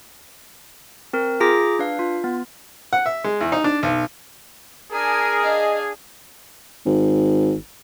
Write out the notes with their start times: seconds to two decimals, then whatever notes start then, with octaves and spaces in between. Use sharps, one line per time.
1.13 C4 A#4
1.40 F4 G#4 A#5 D6 A#6
1.79 D4 B4 F5
1.99 F4
2.24 B3
2.93 F#5
3.06 E5
3.24 G#3
3.41 E2
3.52 D#4
3.64 D4
3.83 B1
4.92 D4 G#4 A#4 G#5
5.44 D4 D#5 F5
6.86 G#1